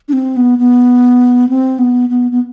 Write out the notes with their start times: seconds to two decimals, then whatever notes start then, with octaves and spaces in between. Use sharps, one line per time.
0.09 D4
0.13 C4
0.37 B3
0.59 B3
1.49 C4
1.79 B3
2.09 B3
2.31 B3